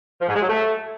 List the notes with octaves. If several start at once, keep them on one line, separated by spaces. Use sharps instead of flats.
F3
G#2
G#3
F#3
A3